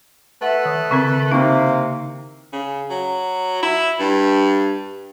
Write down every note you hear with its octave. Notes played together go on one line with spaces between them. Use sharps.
A3 E4 B4 E5 F#5
D#3
C#3 C4 A#4
C3 A#3 C4 D#4 E4
C#3
F#3
E4
G2